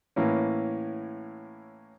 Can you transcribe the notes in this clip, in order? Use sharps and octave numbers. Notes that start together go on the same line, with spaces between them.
A2 E3 A#3 C#4